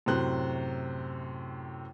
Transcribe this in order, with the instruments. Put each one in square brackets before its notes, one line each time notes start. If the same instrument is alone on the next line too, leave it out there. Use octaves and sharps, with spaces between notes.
[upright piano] F#2 A2 C3 C5 F#6